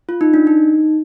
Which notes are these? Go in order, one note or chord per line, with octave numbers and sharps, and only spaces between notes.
F4
D#4
D4
D#4